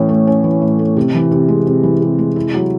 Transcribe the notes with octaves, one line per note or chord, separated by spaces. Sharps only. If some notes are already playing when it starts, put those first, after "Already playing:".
Already playing: A2 E3 C#4
A3
C#4
E3
A2
A3
C3
E3
C3
G#3
C3
E3
C3
G#3
E4
F#3